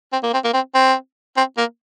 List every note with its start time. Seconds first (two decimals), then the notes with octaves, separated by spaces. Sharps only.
0.12 C4
0.23 A#3
0.33 C4
0.44 A#3
0.53 C4
0.74 C4
1.37 C4
1.57 A#3